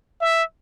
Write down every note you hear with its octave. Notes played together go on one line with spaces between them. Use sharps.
E5